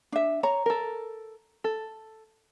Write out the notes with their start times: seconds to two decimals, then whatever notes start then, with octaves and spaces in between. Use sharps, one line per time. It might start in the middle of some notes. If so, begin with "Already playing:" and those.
0.12 D4 E5
0.43 C#5 A#5
0.66 A4 A#4
1.64 A4